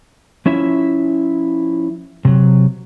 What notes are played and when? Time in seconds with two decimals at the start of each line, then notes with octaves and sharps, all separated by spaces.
0.46 F3 C#4 E4 E5
2.25 C3 F#3